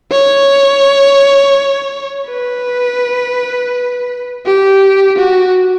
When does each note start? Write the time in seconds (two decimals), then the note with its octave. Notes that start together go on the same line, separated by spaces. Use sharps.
0.11 C#5
2.28 B4
4.46 G4
5.18 F#4